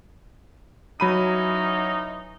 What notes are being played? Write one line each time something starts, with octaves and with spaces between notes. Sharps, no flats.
E3 F#3 C#4 D#4 B5 D#7